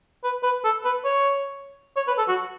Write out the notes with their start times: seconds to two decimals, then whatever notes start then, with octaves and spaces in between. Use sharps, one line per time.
0.24 B4
0.43 B4
0.64 A4
0.85 B4
1.05 C#5
1.96 C#5
2.07 B4
2.18 A4
2.28 F#4